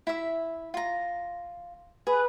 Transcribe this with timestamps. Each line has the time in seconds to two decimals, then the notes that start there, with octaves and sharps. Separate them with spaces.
0.07 E4 E5
0.74 F4 A#5
2.07 G#4 B4